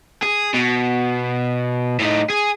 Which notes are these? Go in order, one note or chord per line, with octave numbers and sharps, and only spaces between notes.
G#4
B2
A2 D#4
G#4